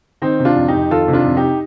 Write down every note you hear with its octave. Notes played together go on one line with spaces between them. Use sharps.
D#3 C4 D#4
C3
D4 F4
F2
F2 D#4 G4
D#3 F4 A4
C3
D4 F4
F2
D#4 G4